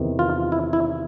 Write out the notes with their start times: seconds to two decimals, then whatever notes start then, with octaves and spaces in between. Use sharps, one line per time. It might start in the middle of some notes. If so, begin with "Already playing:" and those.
Already playing: E2 C3 D#3
0.19 F4
0.52 E4
0.73 E4